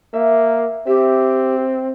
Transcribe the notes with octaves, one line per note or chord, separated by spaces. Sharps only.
A#3 E5
C4 G4 E5